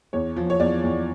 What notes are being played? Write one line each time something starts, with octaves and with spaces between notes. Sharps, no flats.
E2 C#5
F3
C#5
E2 D5
E2